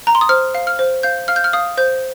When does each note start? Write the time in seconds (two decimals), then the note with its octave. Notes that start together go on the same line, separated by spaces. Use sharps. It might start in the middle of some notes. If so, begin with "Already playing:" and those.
0.07 A#5
0.15 C6
0.21 D#6
0.29 C5 F6
0.55 F5
0.67 F6
0.79 C5
1.03 F5 G6
1.28 F5 F6
1.36 G6
1.44 F6
1.53 F5 D#6
1.77 C5 G6